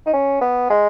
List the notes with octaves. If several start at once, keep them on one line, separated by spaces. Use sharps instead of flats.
D#4
C#4
B3
G#3